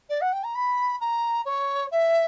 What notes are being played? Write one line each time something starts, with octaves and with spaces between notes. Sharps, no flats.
D5
F#5
G5
A#5
B5
A#5
C#5
E5